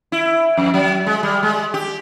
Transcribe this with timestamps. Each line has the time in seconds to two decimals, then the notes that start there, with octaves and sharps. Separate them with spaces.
0.12 E4
0.57 F2
0.74 F#3
1.06 G#3
1.23 G3
1.43 G#3
1.74 G4